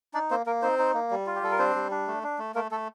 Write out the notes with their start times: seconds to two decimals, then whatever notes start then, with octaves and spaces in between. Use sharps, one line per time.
0.14 D4 D#4 D5
0.31 A#3 C4 C5
0.46 A#3 A#4
0.62 C4 D#4 C5
0.79 D#4
0.94 A#3
1.11 G3
1.27 F4
1.36 G4
1.43 G3 A4
1.52 A#4
1.59 C4 D4 C5
1.75 G3
1.91 D4
2.07 A3
2.23 D4
2.39 A3
2.55 A3 A#3 A#4
2.71 A3 A4